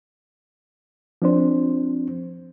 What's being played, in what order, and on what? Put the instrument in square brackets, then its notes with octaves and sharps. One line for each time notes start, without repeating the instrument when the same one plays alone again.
[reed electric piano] F3 C4 D4 C5